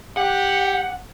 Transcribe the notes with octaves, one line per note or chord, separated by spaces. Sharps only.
G4 F#5